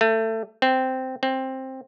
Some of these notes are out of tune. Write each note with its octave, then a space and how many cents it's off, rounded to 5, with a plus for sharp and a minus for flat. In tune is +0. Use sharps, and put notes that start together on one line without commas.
A3 +25
C4 -10
C4 +10